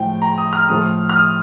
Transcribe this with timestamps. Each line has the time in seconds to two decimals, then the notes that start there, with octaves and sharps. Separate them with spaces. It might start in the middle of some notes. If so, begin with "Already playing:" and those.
Already playing: A2 F3 G5
0.22 A#5
0.38 D#6
0.53 F6
0.69 A2 F3 D#6
1.09 F6
1.17 D#6